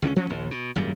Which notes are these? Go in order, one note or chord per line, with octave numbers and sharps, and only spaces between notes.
C#2 D3 C4 C#4
F3 F#3 C4 C#4
A#1 D#2
B2
G#1 F#2 A#2 G3